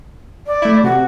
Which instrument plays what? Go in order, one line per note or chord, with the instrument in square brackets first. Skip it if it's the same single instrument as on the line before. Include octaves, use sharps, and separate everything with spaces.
[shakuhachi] D5
[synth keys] A3 E4
[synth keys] C3 [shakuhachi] F#4